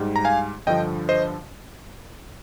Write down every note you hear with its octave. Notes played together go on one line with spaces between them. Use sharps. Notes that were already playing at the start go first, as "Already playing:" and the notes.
Already playing: G#2 G3
A#5
F5 G#5
G2 D3 F3 D#5 G5
C5 D#5